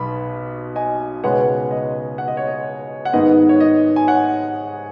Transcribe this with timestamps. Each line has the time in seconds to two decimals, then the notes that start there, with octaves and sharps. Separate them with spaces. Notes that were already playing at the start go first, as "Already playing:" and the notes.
Already playing: B1 B2 B5
0.76 D#5 G#5
1.24 C#2 B2 G#3 B3 C#5 F#5
1.71 D#5
2.18 F#5
2.28 D#5
2.37 C#5
2.47 D#5
3.05 F#5
3.13 G#2 D#3 B3 D#5
3.49 C#5
3.60 D#5
3.96 G#5
4.07 C#5 F#5